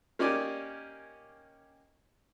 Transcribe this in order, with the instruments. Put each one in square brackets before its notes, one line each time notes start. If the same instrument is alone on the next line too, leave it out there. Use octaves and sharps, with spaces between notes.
[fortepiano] A#3 C#4 D#4 G4 D5 G#5